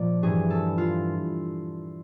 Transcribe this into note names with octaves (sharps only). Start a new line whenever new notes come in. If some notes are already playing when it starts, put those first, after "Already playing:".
Already playing: A#2 F3 D5
G2 E3 G#4
A4
F4